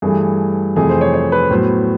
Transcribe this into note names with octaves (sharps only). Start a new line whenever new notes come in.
G2 E3 A3 G#4
F2 C3 E3 A3 G#4
C5
C#5
C#5
B4
A2 F#3 B3 C5